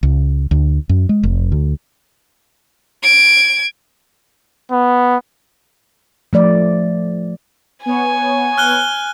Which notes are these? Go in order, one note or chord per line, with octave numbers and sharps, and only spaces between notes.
C#2
D2
F#2
G#3
F1
D2
G#6 D7
B3
F3 A3 D5
B3 C#5 G#5
F6 F#6 G7